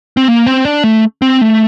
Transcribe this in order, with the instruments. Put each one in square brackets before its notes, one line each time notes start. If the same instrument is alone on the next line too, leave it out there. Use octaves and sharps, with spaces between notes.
[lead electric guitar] C4
A#3
C4
D4
A3
C4
A3